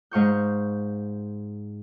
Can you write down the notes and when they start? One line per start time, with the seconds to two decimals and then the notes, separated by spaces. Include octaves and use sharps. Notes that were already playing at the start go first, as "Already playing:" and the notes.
0.11 G#2 F5 C#6 G6